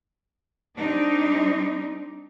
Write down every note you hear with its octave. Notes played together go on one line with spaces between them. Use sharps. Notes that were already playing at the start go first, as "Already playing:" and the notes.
G3 C4 D4 D#4